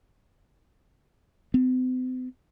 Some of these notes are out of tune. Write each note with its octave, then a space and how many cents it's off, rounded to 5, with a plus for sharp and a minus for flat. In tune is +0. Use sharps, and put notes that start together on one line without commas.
C4 -45